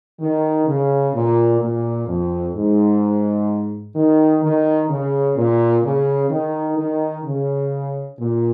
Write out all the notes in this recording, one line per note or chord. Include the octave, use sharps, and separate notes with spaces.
D#3
C#3
A#2
A#2
F2
G#2
D#3
D#3
C#3
A#2
C#3
D#3
D#3
C#3
A#2